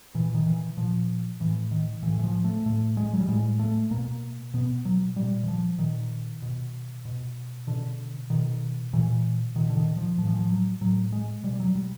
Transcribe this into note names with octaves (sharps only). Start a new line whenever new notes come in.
A#2 E3
D#3
E3
A#2 F3
A2 E3
D#3
A2 E3
E3
F3
A3
A2 A3
G#3
F#3
G3
A2 G#3
A3
B2 A#3
B2 B3
F#3
A#2 G3
E3
F3
A#2 D#3
B2
B2
B2 D3
B2 D#3
A#2 E3
A#2 D#3
D3
D#3
F3
A2 F3
E3
F3
F#3
A2 F#3
G#3
B2 G3
F#3
G3